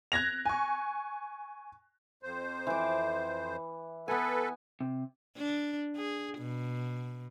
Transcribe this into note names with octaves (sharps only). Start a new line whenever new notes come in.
F#6 G#6 A#6 F7
G#5 C#6
F2 C5
E3 D6
B3 A4 B4 G#5
C3
D4
G#4
B2